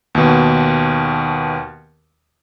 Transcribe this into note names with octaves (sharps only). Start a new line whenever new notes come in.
D#2 B2